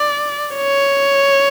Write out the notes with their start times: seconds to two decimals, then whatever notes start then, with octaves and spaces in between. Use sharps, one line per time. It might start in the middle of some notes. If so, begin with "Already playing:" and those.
Already playing: D5
0.56 C#5